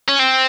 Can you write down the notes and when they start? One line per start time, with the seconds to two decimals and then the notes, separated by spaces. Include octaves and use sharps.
0.09 C#4
0.19 C4